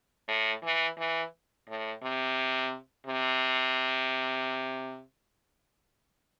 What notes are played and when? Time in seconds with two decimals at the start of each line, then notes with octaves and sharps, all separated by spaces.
0.28 A2
0.63 E3
0.98 E3
1.68 A2
2.03 C3
3.06 C3